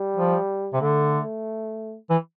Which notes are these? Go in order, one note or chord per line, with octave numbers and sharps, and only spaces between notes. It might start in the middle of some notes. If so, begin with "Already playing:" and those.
Already playing: G3
F3
C3
D3 A3
E3